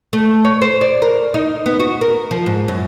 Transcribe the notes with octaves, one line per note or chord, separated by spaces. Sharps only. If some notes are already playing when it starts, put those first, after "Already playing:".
A3
C#5
C5
D5
A#4
D#4
B3
F#4
A#4
F3
G#2
F#2